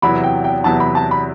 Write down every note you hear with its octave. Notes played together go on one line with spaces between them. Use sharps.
E2 C3 F#3 B3 E4 B5
G5
G5
E2 C3 F#3 B3 E4 A5
B5
A5
B5